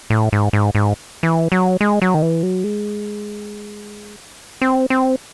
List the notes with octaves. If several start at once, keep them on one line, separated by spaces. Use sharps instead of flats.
A2
G#2
G#2
G#2
E3
F#3
G#3
F#3
D#3
E3
F#3
G#3
C4
C4